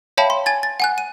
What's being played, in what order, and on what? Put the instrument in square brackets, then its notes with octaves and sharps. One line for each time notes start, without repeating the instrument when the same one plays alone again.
[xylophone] C#5 E5 F5 G5 A5 B5
C6
G#5 G#6 A6
A6
F#5 G#5 F#6
D#7